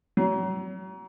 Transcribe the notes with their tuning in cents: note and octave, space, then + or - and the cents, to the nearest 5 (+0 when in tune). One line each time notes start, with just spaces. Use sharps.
F#3 +35